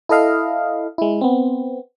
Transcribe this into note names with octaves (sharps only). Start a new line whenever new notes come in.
E4 A4 D#5 F5
G#3 E4
B3 C4